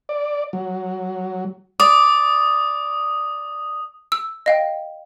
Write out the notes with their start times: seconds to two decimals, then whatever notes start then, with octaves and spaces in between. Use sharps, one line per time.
0.09 D5
0.53 F#3
1.80 D5 D#6
4.12 E6
4.46 D#5 F5 G5